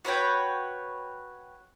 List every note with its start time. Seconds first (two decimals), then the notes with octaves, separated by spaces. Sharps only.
0.05 F#4 B4 C#5 G5